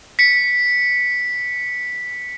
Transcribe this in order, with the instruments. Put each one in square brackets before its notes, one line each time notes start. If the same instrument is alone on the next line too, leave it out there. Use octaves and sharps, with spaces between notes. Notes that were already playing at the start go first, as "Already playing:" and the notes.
[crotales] B6 C#7